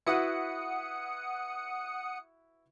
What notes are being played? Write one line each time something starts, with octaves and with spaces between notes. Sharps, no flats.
E4 F#4 B4 F#5 D#6 C#7